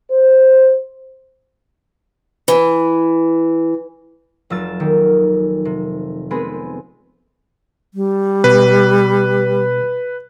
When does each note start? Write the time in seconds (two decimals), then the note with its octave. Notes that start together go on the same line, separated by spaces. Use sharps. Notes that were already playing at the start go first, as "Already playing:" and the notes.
0.10 C5
2.48 E3
4.50 F1 F#3 F4 E6 A6
4.80 D#3 A#3
5.65 C3
6.31 G#3 B3 C4 G#4 B4
7.94 G3
8.44 B2 B4